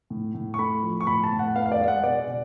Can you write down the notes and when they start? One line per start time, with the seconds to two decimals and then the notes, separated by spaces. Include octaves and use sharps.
0.10 A2
0.34 A2
0.54 C#6
0.59 A3 B5
0.83 F3
1.00 C#6
1.07 A2 B5
1.24 A5
1.32 A2
1.39 F#5
1.55 B3 F5
1.66 F5
1.72 D5
1.80 G#3
1.88 F#5
2.03 B2 D5
2.28 B2